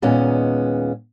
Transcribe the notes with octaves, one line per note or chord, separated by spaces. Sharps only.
D#2 A#2 G#3 B3 C#4